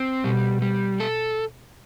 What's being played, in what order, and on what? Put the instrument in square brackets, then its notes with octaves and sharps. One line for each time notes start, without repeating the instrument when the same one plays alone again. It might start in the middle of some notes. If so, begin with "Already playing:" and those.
Already playing: [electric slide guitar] C4
[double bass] B2 [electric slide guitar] G3
[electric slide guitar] G3
A4